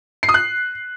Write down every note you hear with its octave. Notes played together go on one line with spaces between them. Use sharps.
C7
D#6
F#6